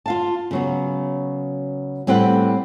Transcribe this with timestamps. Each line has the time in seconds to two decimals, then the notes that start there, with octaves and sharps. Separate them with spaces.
0.06 F4 F5 A5
0.51 C#3 F#3 B3
2.07 A2 G3 C4 G4 B4 F#5